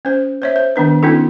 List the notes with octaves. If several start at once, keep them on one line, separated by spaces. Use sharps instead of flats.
C#4 C5
C5 C#5 E5
C5
D#3 B3 D4 B4
B3 C#4 D#4 F4 A4